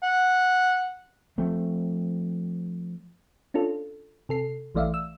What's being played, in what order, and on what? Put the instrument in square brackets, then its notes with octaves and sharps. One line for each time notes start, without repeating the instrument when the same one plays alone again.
[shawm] F#5
[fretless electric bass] F3 A3 C4
[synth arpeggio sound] C#4 D4 F4 A4
C3 A4 C7
A#1 E3 A3 D5 E5 F5
E6